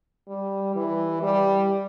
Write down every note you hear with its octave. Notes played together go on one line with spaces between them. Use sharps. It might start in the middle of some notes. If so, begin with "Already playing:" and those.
G3
E3
G3